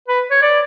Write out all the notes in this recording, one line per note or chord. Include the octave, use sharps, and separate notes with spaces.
B4
C#5
D5